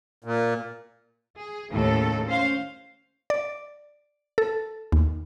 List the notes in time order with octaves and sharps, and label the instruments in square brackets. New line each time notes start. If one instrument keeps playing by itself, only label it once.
[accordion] A#2
[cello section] G#4
D#2 A2 C#3 A4
C#4 C5 F5
[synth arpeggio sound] D5
A4
D#2